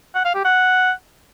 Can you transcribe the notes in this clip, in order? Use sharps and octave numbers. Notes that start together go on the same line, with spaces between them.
F#5
F5
G4
F#5